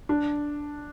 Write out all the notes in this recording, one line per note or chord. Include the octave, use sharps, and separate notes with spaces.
D4